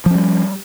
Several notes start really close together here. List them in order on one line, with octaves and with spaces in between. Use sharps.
F3 C#4 G3